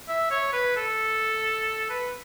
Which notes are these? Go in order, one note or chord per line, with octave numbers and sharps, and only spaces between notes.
E5
C#5
B4
A4
B4